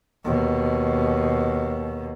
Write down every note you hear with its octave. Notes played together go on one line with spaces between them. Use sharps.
D#2 B2